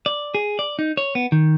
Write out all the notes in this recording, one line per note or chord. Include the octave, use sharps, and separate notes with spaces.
D5
G#4
D5
D#4
C#5
B3
D#3